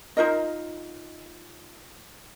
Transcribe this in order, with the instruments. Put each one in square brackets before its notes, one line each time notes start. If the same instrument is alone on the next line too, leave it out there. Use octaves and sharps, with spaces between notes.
[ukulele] D#4 F4 A#4 D#5